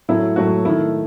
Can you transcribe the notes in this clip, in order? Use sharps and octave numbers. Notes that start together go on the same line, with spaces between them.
A2 F#3 A3 E4
A2 F#3 A3 F#4
D#3 A3 E4